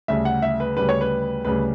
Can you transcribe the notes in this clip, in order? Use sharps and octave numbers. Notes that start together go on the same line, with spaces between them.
D2 C#3 G3 E5
F#5
E5
B4
D2 C#3 G3 B4
C#5
B4
D2 C#3 G3 B4